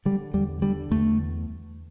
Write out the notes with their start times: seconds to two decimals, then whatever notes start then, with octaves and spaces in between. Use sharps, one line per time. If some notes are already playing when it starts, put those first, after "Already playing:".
0.05 D3 G3
0.34 E2 G3
0.62 D3 G3
0.91 E2 A3